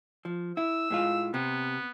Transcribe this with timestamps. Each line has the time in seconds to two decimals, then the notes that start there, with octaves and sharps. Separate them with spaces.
0.25 F3
0.57 E4 E6
0.90 A2 G#3 F4
1.34 C3 B3